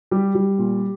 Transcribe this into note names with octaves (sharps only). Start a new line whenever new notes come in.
G3 G4
G3
A#2